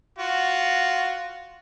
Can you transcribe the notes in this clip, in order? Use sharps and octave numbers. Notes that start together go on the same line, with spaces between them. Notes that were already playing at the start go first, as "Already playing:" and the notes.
F4 F#4